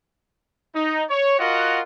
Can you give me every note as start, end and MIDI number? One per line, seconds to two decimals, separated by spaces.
0.74 1.03 63
1.10 1.39 73
1.39 1.80 65
1.39 1.80 66
1.39 1.80 70
1.39 1.80 75
1.39 1.80 78